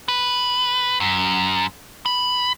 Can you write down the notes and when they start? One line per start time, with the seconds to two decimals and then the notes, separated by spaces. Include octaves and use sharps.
0.08 B4
1.00 F#2
2.06 B5